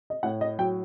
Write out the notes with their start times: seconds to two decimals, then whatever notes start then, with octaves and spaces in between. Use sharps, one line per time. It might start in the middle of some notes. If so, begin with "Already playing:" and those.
0.10 D#5
0.23 A2 F#5
0.41 D#5
0.59 F#3 G5